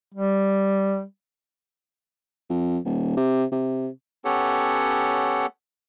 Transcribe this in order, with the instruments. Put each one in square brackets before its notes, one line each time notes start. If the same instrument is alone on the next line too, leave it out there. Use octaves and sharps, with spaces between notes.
[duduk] G3
[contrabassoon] F2
D#1
C3
C3
[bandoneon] B3 C#4 G4 A4 C#5 F#5